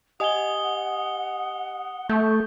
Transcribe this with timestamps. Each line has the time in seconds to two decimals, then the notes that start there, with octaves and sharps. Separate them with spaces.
0.20 G4 D#5 F#5 G#5 D#6 G7
2.09 A3 C#6 G6